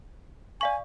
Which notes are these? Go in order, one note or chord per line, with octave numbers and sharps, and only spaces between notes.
D5 F5 G#5 C#6